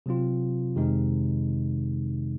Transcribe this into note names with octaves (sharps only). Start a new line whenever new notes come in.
C3 F#3 C4 F4
F2 C3 D#3 G#3 D#4